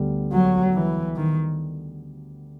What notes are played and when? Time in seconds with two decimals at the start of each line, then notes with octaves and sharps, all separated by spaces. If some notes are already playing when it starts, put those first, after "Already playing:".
Already playing: D2 D3 G3 B3
0.32 F#3
0.74 E3
1.16 D#3